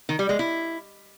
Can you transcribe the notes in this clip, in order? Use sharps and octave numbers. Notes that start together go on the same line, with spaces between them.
D#3
G3
G#3
E4